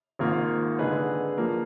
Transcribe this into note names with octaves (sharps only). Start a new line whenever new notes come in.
G#1 G#2 D#3 A#3 F4
D3 G#3 D#4 G#4 B4
F3 A#3